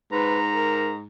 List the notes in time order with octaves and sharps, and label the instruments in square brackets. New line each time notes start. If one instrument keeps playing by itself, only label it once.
[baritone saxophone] G#2 [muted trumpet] B4 [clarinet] A#5
[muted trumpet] A#4